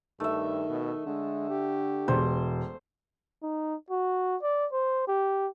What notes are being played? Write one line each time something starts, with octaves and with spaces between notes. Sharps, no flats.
G2 D#3 A3 E5
B2
D3 G#3
G4
E1 C5
D#4
F#4
D5
C5
G4